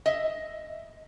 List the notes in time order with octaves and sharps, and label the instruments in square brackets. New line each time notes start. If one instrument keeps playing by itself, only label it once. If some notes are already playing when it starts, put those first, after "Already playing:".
[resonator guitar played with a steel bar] D#5 E5